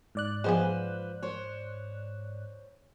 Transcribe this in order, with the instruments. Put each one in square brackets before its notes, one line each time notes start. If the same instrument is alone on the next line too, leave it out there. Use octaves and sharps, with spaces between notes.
[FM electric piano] G#2 D5 F#6
[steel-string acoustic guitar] F3 B4 C5 [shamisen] G#3 B3 G#4
[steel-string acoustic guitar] C5 C#5